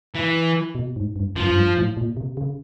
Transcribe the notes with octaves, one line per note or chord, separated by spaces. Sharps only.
E3
B2
G#2
G2
F#2 F3
F#2
G2
A2
A#2
C3
C#3